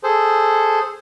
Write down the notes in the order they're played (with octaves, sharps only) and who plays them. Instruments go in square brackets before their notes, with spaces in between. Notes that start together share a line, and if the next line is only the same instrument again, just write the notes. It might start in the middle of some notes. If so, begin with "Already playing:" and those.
[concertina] G#4 A4 C5